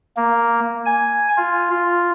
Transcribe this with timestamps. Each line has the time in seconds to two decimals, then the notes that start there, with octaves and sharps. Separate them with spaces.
0.17 A#3
0.86 G#5
1.37 F4
1.71 F4